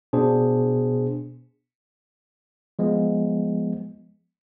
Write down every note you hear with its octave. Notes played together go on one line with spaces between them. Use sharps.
B2 B3 D4 G#4 C5
F3 G#3 B3